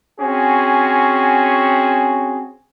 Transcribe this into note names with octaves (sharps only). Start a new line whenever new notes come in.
C4 C#4 F#4 G#4